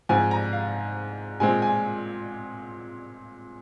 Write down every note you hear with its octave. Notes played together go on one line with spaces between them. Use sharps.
G#2 F3 C4 G#5
A#5
F5
A#2 G#3 C4 G#5
G#5